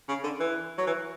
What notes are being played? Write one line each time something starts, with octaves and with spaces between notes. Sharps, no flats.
C#3
D3
E3
F#3
E3